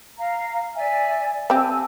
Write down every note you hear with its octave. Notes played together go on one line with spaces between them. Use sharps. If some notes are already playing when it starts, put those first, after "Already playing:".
F5 A#5
D5 E5 G#5
C4 G4 G#5 A5 E6